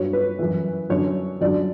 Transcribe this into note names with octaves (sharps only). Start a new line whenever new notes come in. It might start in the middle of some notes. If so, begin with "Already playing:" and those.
Already playing: G2 F#3 C#5
B4
F#2 E3
F#2 D3 F#3 C#5
F#2 D3 F#3 D5